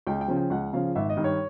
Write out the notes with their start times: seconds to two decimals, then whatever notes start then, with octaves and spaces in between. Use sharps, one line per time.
0.07 C#2 G5
0.21 G5
0.28 C#3 F3
0.36 G5
0.50 C#2 F#5
0.73 C#3 F3 F5
0.95 G#1 E5
1.10 D#5
1.17 G2 D#3
1.24 C#5